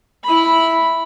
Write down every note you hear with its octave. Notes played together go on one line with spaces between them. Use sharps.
E4 B5